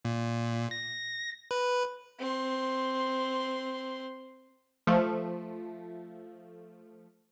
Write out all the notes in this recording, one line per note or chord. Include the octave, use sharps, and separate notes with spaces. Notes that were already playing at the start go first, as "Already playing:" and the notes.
A#2
A#6
B4
C4 C6
F3 A3